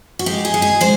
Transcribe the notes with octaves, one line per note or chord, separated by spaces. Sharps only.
F#4
G#3 G4
G#4
G#3
G#4
G#3 C5